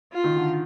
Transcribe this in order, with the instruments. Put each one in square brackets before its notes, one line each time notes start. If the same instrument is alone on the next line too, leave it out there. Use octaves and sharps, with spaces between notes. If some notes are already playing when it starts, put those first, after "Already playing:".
[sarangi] F4
[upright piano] D#3
D3